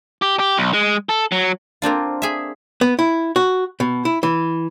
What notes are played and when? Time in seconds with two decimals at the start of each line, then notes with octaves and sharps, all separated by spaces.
0.22 G4
0.39 G4
0.57 B1
0.74 G#3
1.09 A4
1.32 F#3
1.82 A#3 C4 D4 F4
2.22 G#4 E5
2.81 B3
2.99 E4
3.36 F#4
3.80 B2
4.05 E4
4.23 E3